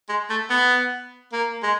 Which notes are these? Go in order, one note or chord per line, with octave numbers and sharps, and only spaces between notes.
G#3
A3
B3
A#3
G#3